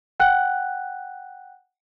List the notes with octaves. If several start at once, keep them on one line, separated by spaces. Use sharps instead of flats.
F#5 G5 F#6